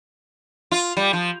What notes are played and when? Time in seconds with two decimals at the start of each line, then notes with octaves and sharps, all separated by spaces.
0.72 F4
0.97 G3
1.13 F3